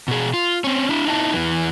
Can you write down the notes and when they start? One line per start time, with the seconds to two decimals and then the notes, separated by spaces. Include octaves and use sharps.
0.08 B2 G#4
0.34 F4
0.64 C4 C#4
0.89 D4 E4
1.07 D#4 E4 G#5 A5
1.33 E2 E3